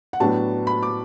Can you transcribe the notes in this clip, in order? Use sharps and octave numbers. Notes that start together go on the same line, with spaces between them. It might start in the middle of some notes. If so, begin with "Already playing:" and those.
F#5
A2 F#3 B3 D4 A5
B5
D6